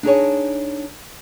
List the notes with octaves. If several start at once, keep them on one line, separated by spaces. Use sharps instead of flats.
D4 D#4 G#4 C#5